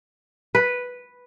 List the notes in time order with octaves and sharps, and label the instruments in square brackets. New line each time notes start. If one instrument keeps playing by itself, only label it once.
[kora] B4